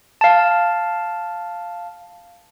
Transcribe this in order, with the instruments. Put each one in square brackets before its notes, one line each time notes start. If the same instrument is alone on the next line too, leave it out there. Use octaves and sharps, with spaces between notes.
[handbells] F5 A5